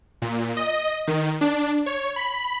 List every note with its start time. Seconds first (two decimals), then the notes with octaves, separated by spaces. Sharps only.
0.22 A#2
0.57 D#5
1.07 D#3
1.41 D4
1.86 C#5
2.16 B5